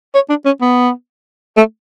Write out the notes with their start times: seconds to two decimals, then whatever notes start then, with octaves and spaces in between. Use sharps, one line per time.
0.14 C#5
0.29 D4
0.45 C#4
0.61 B3
1.57 A3